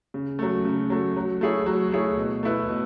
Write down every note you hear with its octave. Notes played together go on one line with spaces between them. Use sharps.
C#3
F#3 A3
C#3
F#3 A3
F#3
A3 E4 G#4 C#5
F#3
A3 E4 G#4 C#5
B2
A3 E4 B4
B2